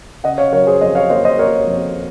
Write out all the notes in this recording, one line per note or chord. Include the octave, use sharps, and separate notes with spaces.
C#3 D#5 F#5
C#5 F5
F#3 A#4 C#5
G#4 C5
F2 C5 D#5
C#5 F5
A#3 C5 D#5
C5 D#5
A#3 A#4 C#5
F2